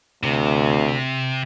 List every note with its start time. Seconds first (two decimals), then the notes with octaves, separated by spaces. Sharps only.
0.23 D2 C3